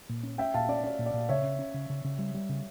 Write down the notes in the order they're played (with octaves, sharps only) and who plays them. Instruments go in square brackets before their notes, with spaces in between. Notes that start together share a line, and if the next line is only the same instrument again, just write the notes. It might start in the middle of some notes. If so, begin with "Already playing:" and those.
[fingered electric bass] A#2
C#4
[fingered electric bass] C#4 [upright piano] E5 G5
[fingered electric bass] A#2 [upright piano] F5 A5
[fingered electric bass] C#4 [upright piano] D5
[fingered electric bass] C#4 [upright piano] D5
[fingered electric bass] A#2
[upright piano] D5
[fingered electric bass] A#2
[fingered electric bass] C#3 [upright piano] C#5 E5
[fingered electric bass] C#4
C#4
C#3
C#3
C#3
G3
G3
C#3